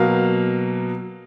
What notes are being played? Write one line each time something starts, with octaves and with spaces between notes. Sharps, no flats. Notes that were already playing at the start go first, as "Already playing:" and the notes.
Already playing: B2 F#3 A#3 F5